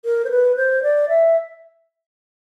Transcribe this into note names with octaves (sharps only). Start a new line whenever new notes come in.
A#4
C5
B4
C5
D5
E5